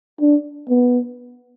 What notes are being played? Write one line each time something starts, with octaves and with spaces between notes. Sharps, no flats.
D4
B3